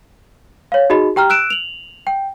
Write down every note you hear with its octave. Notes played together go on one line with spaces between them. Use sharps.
C#5 F5
D#4 F#4 G#4 D#5 B5
G4 G5 A#5 F6
E6 F#6 D7 E7
F7 F#7
G5